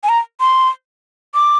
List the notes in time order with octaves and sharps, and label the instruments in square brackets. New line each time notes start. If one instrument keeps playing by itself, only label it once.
[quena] G#5
A#5
C6
D6